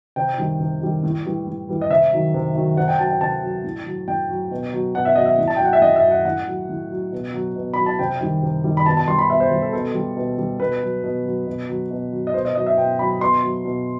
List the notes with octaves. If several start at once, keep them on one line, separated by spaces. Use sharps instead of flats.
C3 G5
D#3 G3
C3
D#3 G3
A2
E3 G3
A2
E3 G3
D#5
C3 E5
D#3 F#3
C3
D#3 F#3
C3 F#5
G5
F#3 A5
G5
C3 A5
F#3
A2
F#3
A2 G5
F#3
B2
F#3
B2 F#5
E5
F#3 D#5
E5
A2
A5
G5
F#3 F#5
E5
A2 D#5
E5
F#3
F#5
A2 F#5
F#3
A2
F#3
B2
F#3
B2
F#3 B5
A5
C3 G5
D#3 G3
C3
D#3 G3
B5
B2 A5
A5
G3 C6
B5
B2 E5
C5
G3
A4
B2 A4
G3
B2
G3
B2 B4
F#3
B2
F#3
B2
F#3
B2
F#3
D#5
B2 C5
D#5
F#3 D#5
E5
B2 G5
F#3 B5
B2 C6
F#3
B2